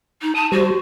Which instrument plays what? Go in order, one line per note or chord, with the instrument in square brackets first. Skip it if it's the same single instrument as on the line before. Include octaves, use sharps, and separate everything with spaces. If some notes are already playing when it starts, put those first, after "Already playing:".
[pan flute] D#4
[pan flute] A5 [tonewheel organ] D#6
[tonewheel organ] G3 C5 [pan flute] F#4